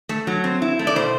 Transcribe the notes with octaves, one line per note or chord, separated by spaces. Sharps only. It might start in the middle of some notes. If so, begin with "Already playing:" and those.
A3
F#3
C4
E4
A3
D5
B2 C5